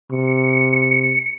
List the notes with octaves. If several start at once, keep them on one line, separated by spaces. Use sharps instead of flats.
C3 C#7